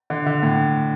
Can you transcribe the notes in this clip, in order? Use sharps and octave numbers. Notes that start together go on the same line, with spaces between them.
D3
D3
A2